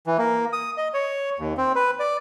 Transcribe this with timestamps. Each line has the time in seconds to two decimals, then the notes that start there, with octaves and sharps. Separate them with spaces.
0.07 E3
0.18 A#3
0.53 D#6
0.77 D#5
0.94 C#5
1.39 D#2
1.57 C4
1.75 B4
1.99 D5